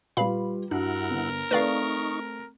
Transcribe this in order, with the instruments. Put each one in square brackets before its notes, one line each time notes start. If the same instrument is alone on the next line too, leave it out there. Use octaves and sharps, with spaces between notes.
[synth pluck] A#2 F5 B5 [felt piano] G3 F4 B4
[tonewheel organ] G2 E4 F#5 [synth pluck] D4 [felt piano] F#4 [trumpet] A#4
[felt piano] G1
[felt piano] A3 C4 [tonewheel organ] D#4 C#6 [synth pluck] B4 D5 F5